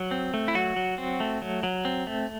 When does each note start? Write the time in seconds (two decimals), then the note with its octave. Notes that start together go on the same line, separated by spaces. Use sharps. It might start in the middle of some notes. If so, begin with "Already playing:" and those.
Already playing: F#3
0.11 C4
0.34 A3
0.48 E4
0.55 F#3 F#4
0.76 F#3
0.98 C4
1.20 A3
1.42 F#3
1.63 F#3
1.85 C4
2.07 A3